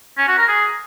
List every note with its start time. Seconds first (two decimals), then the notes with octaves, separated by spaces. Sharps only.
0.18 C#4
0.28 F#4
0.38 A#4
0.48 G#4